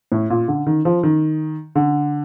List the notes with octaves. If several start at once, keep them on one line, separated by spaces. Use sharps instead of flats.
A2
A#2
D3
D#3
F3
D#3
D3